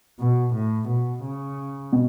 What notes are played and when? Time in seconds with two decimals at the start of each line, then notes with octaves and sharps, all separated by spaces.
0.19 B2
0.54 A2
0.89 B2
1.24 C#3
1.93 B2